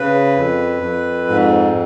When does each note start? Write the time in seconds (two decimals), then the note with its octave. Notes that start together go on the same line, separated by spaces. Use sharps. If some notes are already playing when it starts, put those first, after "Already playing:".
Already playing: C#3 B4
0.37 F2
0.82 F2
1.28 G#2